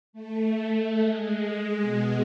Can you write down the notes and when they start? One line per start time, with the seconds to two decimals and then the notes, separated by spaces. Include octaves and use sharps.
0.13 A3
0.97 G#3
1.81 B2